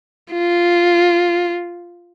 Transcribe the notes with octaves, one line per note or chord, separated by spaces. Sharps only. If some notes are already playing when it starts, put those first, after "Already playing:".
F4